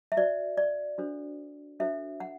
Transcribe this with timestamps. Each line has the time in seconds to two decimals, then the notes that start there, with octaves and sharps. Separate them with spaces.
0.12 E5
0.17 F#4 C5 D5
0.57 D5
0.98 D4 F#4 A4 C5
1.80 D4 F#4 A4 C5 E5
2.20 F#5